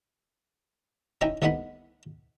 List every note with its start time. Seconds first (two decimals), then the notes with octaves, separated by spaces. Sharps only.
1.21 C#4 D#4 E4 G5 A#5
1.42 C2 A3 B3 D#4 F#5 B5